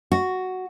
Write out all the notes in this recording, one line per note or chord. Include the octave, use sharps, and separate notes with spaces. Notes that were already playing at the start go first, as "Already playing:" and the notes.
F#4